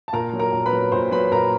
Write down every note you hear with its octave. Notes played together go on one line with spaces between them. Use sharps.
A5
A#2 A#4 A#5
F#3
A#4 A#5
A#2
B4 B5
F#3
A#2 C5 C6
F#3 B4 B5
A#2 A#4 A#5